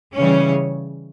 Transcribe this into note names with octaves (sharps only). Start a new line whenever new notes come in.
C#3 E3 G3 C#4